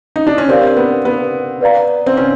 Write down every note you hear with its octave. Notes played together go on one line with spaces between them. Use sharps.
D#4
D4
C#4
C4 D4 G4 A#4 D5 F5
B3
B3
B4 D5 F5 A#5
C4
C#4